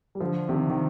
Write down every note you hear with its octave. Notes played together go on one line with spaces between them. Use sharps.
G3
D3 F3
C3 D#3
D#3